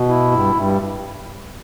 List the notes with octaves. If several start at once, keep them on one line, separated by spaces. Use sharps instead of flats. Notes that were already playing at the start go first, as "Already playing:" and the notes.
Already playing: B2
E4
G2
G2